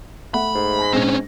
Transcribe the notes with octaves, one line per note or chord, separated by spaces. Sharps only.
A3 E5 F#5 B5
G#2
G#5 A#6
A#1 G#3 C4 C#4 A#6